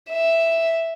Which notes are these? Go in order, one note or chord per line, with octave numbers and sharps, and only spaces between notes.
E5